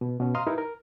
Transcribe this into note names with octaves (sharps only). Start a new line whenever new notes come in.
B2
B2 C#4
D#5 F5 A#5 C6 D#6 F6
D#4 E4 G4 A#4 B4
A#4